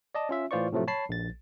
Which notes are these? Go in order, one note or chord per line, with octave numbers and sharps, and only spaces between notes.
D5 D#5 A5
C#4 F4 E5
A2 E3 F4 C5 D5 C#6
A2 C3 F3 F#3 A3
C#5 A5 B5 C7
A#1 A6